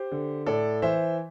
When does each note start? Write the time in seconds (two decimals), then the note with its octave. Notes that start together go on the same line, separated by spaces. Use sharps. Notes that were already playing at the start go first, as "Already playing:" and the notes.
Already playing: G4 C5
0.12 D3
0.46 A2 A4 D5
0.82 E3 C5 E5